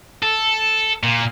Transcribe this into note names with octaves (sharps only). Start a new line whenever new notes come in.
A4
A#2